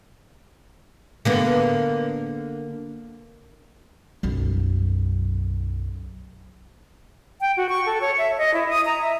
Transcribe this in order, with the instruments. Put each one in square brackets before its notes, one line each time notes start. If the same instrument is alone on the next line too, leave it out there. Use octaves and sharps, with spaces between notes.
[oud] D3 A#3 B3
[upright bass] B1 F#2
[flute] G5
F#4
C#6
A4
C#5
E5
D#5
E4
D#6
A#5
E5